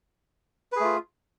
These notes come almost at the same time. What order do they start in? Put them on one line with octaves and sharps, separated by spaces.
B4 G#4 A3 F4